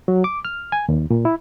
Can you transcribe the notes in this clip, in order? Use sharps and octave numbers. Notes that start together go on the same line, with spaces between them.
F#3
D6
F6
G#5
D#2
A#2
E4